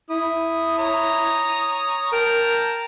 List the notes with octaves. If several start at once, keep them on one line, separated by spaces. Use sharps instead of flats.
E4 D#6
C#5 A#5 D#6
A#4 G5 A5 A#5